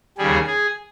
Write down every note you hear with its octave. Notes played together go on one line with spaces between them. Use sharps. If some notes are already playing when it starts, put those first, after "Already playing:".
D#2 C#3 G3 G#4
G#4